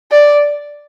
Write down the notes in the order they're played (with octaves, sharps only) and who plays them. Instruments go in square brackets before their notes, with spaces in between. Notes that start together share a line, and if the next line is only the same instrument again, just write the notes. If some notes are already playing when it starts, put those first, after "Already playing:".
[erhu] D5